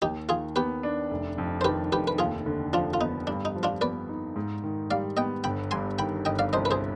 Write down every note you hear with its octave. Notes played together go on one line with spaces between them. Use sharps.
D#2 D#4 G4
D#3 F4 G#4
B3 G4 B4
D4
F1
F2
C5
D#3 G4 B4
F1 G4 B4
B4
D#2 F4 G#4
D3
F3 D4 F4
F4
B3 D#4
G2 D4
D#4
F3
D4 F4
B3 B4 D5
D#4
G#2
D#3
G3 D5 F5
B3 D#5 G5
G1 G5 B5
G2 G#5 C6
D#3 G5 B5
G1 D#5 G5
D5 F5
C2 C5 D#5
B4
G#4 C5